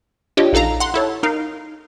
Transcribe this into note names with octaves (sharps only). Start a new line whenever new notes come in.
D4 F4 G4 C#5 D#5
A#1 D#4 A4 F5 A#5
F#5 C6
E4 A4 C#5
D#4 A#4 F5